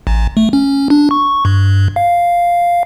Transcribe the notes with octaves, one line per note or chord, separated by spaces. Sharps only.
A1
A3
C#4
D4
C#6
G2
F5